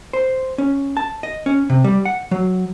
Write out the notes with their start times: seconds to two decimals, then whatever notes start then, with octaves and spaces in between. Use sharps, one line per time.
0.13 C5
0.58 C#4
0.97 A5
1.23 D#5
1.46 C#4
1.70 C3
1.84 G3
2.05 F#5
2.31 F#3